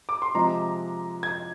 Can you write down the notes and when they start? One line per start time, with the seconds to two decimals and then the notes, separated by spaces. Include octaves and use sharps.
0.09 D6
0.22 C6
0.35 C3 F3 G#3 A#5
1.23 G#6